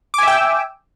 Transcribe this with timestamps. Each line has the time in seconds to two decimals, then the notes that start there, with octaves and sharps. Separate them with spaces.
0.14 D6
0.18 G#5
0.23 E5
0.28 G5
0.32 E6